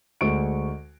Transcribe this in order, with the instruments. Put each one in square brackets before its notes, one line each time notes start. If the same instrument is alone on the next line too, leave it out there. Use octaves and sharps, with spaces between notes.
[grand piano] D2 G#3 C#6 D7